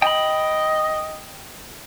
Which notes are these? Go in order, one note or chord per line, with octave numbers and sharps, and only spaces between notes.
D#5 G5 B5